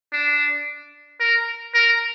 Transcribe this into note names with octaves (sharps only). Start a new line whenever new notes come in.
D4
A#4
A#4